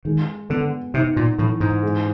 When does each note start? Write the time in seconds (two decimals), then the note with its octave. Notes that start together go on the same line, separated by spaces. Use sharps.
0.05 D#3 G#3
0.50 D3 B3
0.94 C3 D#4
1.16 A#2
1.38 A2 E3
1.60 G#2
1.83 G#3